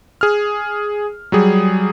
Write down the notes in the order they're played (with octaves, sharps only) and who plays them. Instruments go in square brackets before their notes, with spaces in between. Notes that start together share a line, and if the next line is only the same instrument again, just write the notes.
[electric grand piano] G#4 F6
F#3 G3 G#4